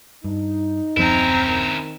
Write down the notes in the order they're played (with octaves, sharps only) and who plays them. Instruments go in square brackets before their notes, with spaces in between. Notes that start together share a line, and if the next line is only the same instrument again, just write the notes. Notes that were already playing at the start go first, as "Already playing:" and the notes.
[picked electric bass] G2 [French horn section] D#4
[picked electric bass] D#1 F#2 F3 [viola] C4 A#5 [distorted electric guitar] C#4 E4
[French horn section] D#3